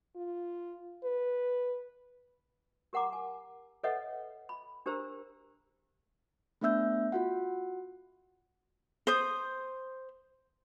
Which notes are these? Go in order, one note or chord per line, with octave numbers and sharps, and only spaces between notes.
F4
B4
G4 A#4 F#5 A#5 D6
G#5
A4 B4 C#5 D#5 E5 F#5
B5
D4 G4 A#4 C5 A#5 E6
A3 B3 D4 E5 E6 G6
F4 F#4 F#5
C5 D#6